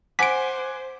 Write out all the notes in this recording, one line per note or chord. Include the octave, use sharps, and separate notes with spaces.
C5 F#5 G#5 D6 B6 D7